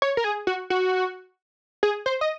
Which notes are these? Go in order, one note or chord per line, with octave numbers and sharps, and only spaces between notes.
C#5
A#4
G#4
F#4
F#4
G#4
C5
D#5